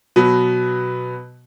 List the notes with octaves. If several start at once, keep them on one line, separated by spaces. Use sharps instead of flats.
B2 F#3 B3